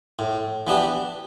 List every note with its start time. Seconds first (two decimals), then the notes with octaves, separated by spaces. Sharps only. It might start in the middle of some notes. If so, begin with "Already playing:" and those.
0.19 A2
0.67 E3 B3 D4 G4